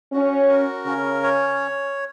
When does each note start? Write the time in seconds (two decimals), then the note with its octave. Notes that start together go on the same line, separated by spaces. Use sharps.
0.13 C#4 F#4
0.50 A#4
0.86 C#3 C#4
1.23 C#5